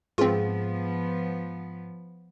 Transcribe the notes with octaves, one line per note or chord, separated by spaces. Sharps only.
G#2 F3 B3 C4 F4 G#4 B4 F5